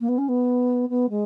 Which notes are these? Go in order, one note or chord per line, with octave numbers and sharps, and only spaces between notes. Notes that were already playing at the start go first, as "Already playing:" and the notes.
A#3
B3
C#4
B3
B3
G#3